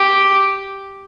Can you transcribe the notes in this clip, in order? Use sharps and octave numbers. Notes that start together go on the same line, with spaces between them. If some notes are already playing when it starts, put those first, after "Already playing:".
Already playing: G4